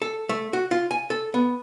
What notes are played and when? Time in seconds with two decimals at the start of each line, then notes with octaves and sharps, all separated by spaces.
0.02 A4
0.29 A3
0.53 F#4
0.71 F4
0.91 G#5
1.10 A4
1.34 B3